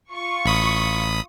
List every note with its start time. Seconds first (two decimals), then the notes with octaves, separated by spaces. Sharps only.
0.12 F4 C#6
0.46 A1 B5 D#6